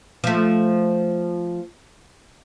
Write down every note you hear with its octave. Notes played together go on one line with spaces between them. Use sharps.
F3 A3